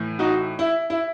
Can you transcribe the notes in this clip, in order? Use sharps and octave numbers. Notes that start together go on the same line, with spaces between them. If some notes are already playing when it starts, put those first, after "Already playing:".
Already playing: A2 E3
D#4 F#4
E4
E4